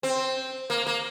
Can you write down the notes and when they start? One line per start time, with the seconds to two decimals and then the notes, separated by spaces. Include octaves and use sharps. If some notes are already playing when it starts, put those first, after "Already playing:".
0.03 C4
0.70 A#3
0.86 A#3